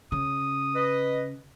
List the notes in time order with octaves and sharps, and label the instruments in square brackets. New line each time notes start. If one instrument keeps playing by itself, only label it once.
[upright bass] C#3 [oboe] D#6
[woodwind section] B4 D#5